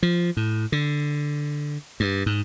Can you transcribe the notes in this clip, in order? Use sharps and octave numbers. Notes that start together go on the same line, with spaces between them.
F3
A2
D3
G2
G#2